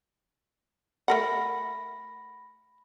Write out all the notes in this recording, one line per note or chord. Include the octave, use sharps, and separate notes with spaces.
A3 A#4 F#5 B5 A#6